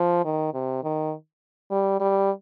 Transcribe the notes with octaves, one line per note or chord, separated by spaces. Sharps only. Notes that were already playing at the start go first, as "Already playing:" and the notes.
Already playing: F3
D#3
C3
D#3
G3
G3